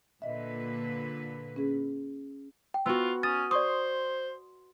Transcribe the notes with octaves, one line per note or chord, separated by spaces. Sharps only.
A#2 D3 B4 D#5 E5
C#4 G#4
G5
B3 F4 F#4 E6
C#4 D#6 A6
C5 D5 C6 C#6 D#6